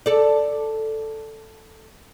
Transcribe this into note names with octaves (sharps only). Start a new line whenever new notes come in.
A4 D5